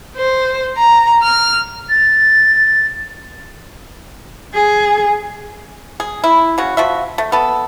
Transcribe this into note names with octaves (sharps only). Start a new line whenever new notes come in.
C5
A#5
F6
A6
G#4
G#4
E4
C#3 F#4
F3 F#4 E5
A3
B3 A4